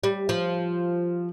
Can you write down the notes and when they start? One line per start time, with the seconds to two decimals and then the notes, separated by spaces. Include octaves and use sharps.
0.04 G3
0.29 F3